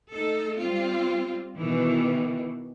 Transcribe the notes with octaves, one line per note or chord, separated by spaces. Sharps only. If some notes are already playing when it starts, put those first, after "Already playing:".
A3 D#4 A4
G3 C4 F4
B2 D#3 E3